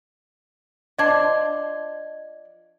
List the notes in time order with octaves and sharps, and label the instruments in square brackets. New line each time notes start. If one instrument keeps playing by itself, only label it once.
[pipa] F3 D4 C6 [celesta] D#5 G#6